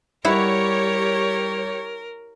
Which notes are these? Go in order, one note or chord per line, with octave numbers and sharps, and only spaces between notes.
G3 E4 G4 A#4 C#5 E5 F#5